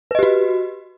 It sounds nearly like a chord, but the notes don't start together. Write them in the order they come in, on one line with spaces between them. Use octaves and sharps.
B4 D#5 G4 F#4